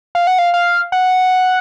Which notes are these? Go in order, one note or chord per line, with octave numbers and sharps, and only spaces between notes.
F5
F#5
F5
F5
F#5